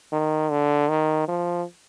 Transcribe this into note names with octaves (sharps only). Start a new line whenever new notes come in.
D#3
D3
D#3
F3